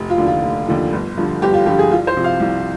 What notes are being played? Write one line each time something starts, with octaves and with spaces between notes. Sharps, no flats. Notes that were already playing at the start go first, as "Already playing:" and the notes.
Already playing: F1
F4
D#2 D3 F3
F4
F1
D#2 D3 F3
G1
G2 D3 F3
G1 G4
F4
G2 D3 F3 G4
G#4
C2 F4
C5
C3 F3
F5
C2